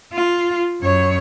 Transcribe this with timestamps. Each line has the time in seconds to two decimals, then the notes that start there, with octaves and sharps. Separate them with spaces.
0.13 F4
0.82 F#2 C#5